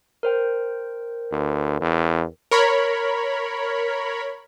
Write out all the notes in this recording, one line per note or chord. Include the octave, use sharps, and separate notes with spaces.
A#4 C5 G5
D2
E2
A#4 C#5 B5